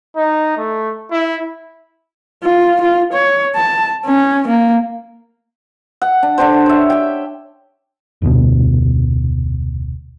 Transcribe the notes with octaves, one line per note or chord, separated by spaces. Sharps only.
D#4
A3
E4
F4
F4
C#5
A5
C#4
A#3
F#5
D4
D3 D4 G4 C5
C#5 E5
G4 G5
F1 D2 B2